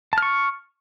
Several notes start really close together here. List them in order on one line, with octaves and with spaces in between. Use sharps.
A5 F6 C#6